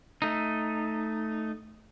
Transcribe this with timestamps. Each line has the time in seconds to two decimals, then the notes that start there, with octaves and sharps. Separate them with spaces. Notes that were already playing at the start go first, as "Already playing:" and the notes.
0.22 A3 D#4